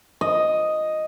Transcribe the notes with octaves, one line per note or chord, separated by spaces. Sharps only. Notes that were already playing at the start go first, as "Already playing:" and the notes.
D#5